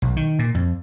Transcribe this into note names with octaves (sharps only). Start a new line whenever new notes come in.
B1
D#3
A#2
F2